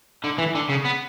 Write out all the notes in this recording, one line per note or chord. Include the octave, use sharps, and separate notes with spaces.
D3
E3
D3
C#3
B3